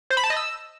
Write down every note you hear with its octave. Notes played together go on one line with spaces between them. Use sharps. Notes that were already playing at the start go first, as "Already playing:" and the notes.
C5
B5
A5
D#5
E6